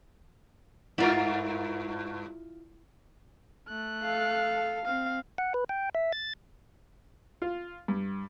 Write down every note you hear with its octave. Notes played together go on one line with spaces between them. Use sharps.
G2 E4 F4 A#4
A3 F#6
A4 F5
C4 F5
F#5
B4
G5
E5
A6
F4
G2